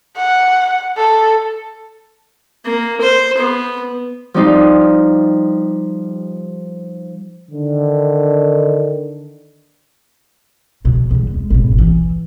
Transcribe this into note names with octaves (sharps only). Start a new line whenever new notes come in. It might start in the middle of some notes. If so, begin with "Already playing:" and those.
F#5
A4
A#3
C5
B3
F3 G3 D#4 F4
D3 D#3
B2 F3
E2 G3
G#3
G#1 B2
E3